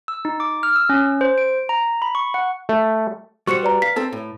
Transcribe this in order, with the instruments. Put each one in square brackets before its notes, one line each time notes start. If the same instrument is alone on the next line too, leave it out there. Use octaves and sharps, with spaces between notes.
[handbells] E6
D#4
D6
F6
E6
C#4
C5
D7
A#5
B5
C#6
F#5
[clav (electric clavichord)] A3
[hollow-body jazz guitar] G3 F#4 C5 [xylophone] C#6 C#7
[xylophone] B4 D5 A#5
[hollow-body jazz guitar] F5 [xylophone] B6
[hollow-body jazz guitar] C4 A4 A5
A2